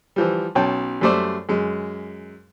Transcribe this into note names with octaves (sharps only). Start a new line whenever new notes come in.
E3 F3 G3
B1 C#4 G5 A5
F#2 G3 A3 C5 D5
F#2 G#3